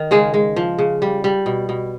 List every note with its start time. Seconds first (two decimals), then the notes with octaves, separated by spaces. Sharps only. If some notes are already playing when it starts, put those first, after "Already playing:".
Already playing: D#3
0.11 C#3 G#3 G#4
0.34 G#3
0.56 F3
0.79 C#3
1.02 G3
1.24 G3
1.46 B2
1.69 B2